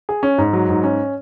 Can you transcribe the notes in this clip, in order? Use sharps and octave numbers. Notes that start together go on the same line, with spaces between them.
G#4
C#4
G#2
F#3
G#2
C#4